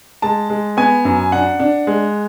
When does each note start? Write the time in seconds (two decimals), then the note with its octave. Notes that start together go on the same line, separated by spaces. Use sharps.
0.22 G#3 A5
0.50 G#3
0.77 B3 G#5
1.05 F#2
1.32 D4 F#5
1.60 D4
1.87 G#3